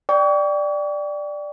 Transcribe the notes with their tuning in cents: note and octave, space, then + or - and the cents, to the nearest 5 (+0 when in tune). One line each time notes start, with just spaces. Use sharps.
D5 +5 G5 +0 C#6 +40